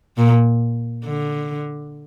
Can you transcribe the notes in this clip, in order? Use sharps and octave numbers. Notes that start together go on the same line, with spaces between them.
A#2
D3